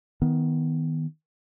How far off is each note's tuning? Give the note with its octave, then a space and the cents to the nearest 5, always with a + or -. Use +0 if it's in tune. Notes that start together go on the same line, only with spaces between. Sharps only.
D#3 +20 B3 +0